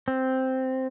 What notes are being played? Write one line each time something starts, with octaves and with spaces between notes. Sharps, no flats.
C4